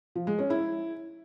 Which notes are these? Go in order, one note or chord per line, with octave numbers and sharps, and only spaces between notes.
F3
G#3
C#4
E4